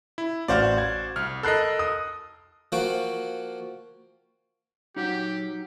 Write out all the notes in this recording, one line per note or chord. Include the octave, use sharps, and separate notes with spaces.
E4
A1 F#4 C5 D5 F5 F6
G#6
C2 F6
A4 A#4 D#5 B5 F#6 C7
D#6
F3 A#3 F#4 G5
F#3 D#4 G4 F#5